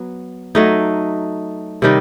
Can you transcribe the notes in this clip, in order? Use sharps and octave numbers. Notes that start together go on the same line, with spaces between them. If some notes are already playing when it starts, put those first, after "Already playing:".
Already playing: F#3 B3
F#3 A3 D#4
C3 D#3 G3 D#4